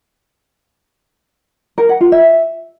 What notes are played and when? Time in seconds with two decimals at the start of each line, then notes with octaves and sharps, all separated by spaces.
1.78 A#4
1.89 F#5
2.01 F4
2.12 E5